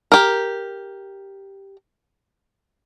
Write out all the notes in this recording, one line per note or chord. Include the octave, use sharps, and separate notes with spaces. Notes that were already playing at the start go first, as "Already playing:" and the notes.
G4 A#4